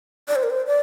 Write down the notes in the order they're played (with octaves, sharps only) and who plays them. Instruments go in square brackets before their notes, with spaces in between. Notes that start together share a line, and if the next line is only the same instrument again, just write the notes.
[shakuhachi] D5
C5
A#4
C5
D5